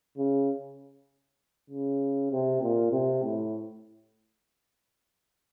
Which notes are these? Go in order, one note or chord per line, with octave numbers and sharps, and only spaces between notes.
C#3
C#3
C3
A#2
C3
A2